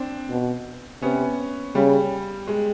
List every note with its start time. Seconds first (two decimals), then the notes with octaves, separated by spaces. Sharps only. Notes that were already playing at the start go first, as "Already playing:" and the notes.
Already playing: C4 D4
0.30 B2
1.02 C3 B3 C#4
1.75 C#3 G3
2.47 G#3